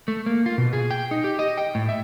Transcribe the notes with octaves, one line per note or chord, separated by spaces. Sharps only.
A3
A#3
F4
B2
G#4
G5
D#4
G4
D#5
G5
A2
E5